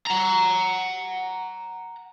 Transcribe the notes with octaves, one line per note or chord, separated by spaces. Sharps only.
F#5 A#5